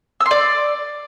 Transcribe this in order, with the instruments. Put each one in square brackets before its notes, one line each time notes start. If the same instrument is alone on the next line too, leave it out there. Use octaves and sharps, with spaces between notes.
[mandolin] E6
C6
D5